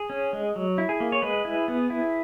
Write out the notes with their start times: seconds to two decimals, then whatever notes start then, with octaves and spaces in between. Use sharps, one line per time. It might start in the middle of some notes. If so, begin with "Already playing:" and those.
Already playing: G#4
0.10 C#4
0.33 G#3
0.56 F#3
0.78 E4
0.89 G#4
1.00 A#3
1.12 C#5
1.22 G#3 G#4 B4
1.45 E4
1.68 B3
1.90 E4